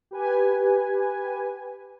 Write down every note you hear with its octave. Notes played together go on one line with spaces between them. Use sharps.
G4 B4 G#5